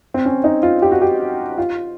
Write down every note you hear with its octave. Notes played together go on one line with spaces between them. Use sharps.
C4
C#4
D#4
F4
G4
F#4
G4
F4